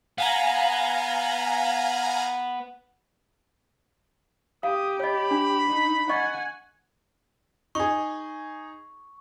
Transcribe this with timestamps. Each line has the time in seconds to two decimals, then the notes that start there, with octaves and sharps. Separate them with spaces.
0.18 B3 F5 G#5 A#5
4.63 G4 F5 D#6
5.00 C#5 D#5 B5
5.31 D4
5.68 D#4
6.09 D#5 F#5 G#5 C#6
7.75 D#4 G#4 C#6